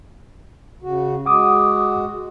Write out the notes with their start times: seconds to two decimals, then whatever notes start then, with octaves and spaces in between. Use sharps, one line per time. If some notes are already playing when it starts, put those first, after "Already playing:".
0.83 C#3 F#4
1.26 G#3 F#4 F#5 D6 D#6